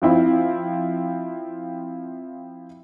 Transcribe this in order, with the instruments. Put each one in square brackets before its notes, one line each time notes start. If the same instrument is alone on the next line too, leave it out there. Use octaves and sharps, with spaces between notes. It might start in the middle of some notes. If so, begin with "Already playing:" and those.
[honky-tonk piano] F3 C4 E4 F4